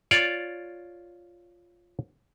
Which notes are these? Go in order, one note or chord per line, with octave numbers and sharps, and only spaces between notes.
F4 C#5 D5